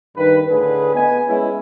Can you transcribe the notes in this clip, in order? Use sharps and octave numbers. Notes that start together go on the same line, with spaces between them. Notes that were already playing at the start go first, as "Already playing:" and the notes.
G2 D#3 B4
D2 A2 D3 G#4 B4
B3 D#5 G#5
G#3 B3 C#4 E4